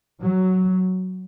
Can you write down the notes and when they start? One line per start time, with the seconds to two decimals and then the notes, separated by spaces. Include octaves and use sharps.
0.22 F#3